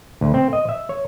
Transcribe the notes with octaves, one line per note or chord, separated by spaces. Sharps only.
D2
C4
D#5
E5
C#5